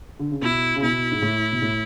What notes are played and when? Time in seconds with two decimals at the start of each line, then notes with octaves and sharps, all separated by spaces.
0.19 D3
0.31 C#3
0.42 B2 E4
0.76 C#3
0.82 B2 E4
1.11 G#2
1.22 A2
1.52 B2
1.62 A2